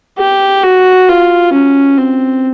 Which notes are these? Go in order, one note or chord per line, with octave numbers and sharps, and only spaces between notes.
G4
F#4
F4
C#4
C4